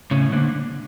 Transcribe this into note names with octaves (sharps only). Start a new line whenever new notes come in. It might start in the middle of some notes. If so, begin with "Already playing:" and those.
A2 C#3 C#4
D3 A#3 D4